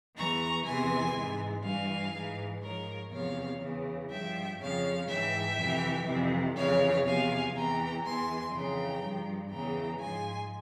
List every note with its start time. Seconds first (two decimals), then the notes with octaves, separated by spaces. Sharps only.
0.16 E2 E3 A#5 C#6
0.65 E2 C3 E3 G#5 C6
1.15 G#2 E3
1.64 G2 E3 F5 G#5
2.12 G#2
2.18 E3
2.62 G#2 F3 A#4 C#5
3.11 E2 C3 F3 C#5 F5
3.60 E2 C#3 E3
4.10 G2 F3 E5 G5
4.59 F2 C#3 F3 C#5 F5
5.08 G#2 E3 E5 G5
5.58 F2 C3 E3
6.07 F2 C3 E3
6.56 F2 C#3 E3 C#5 F5
7.05 E2 C3 F3 F5 G#5
7.54 E2 E3 G5 A#5
8.03 E2 E3 G#5 C6
8.53 F2 C#3 E3 G5 A#5
9.02 G2 F3
9.51 E2 C#3 E3 G5 A#5
10.00 G#2 F3 G#5 C6